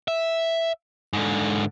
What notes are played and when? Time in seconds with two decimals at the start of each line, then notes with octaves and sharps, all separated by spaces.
0.08 E5
1.13 G#2 D3